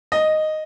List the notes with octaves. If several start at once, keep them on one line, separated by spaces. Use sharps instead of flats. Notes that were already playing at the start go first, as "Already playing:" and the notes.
D#5